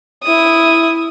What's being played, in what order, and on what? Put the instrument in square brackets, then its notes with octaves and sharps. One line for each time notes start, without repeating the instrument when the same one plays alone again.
[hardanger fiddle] E4 D#6